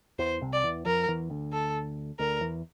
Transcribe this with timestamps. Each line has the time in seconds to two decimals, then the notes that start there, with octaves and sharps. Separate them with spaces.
0.19 E2 E3 C5
0.41 C2 C3
0.53 D5
0.63 E2 E3
0.85 F2 F3 A#4
1.08 E2 E3
1.30 D2 D3
1.53 A4
2.19 D2 D3 A#4
2.41 E2 E3